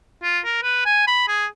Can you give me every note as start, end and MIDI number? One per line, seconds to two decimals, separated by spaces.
0.23 0.39 65
0.44 0.59 70
0.63 0.85 71
0.85 1.06 80
1.07 1.27 83
1.28 1.46 68